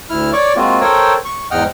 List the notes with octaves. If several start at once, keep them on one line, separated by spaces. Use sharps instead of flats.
D2 E4 F6
C#5 D5 C#6 D6
G#3 A#3 C4 F4 F#4
A4 A#4 C5 C#5 G5
C#6
E2 G#2 D#5 F#5 G5 F6